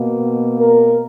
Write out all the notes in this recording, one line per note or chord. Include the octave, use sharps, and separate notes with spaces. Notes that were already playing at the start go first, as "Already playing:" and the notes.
Already playing: B2 A#3
A#4